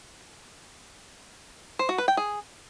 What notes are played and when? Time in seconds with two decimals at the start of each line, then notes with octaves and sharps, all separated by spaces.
1.79 C5
1.89 F#4
1.98 B4
2.08 G5
2.17 G#4